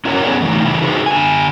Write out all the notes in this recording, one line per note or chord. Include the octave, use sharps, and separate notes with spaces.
C#4 E4 F#4 A#4 B4 C#5
B3 C#4 G#4 A4 D5
E3 F#3 A3 D#4
C#3 E3 E4
D#4 F#4 G#4 A4 B4 C5
D3 G#5